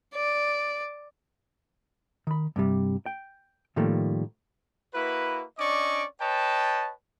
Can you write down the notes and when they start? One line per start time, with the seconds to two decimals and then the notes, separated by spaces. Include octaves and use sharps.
0.14 D5
2.27 D#3 B5
2.56 G2 C3 G3
3.06 G5
3.76 A2 D#3 F3 G3 A3 A#3
4.94 A#3 E4 F#4 B4
5.59 C#4 D4 D5 D#5 C#6 D6
6.20 B4 C#5 D#5 G5 A5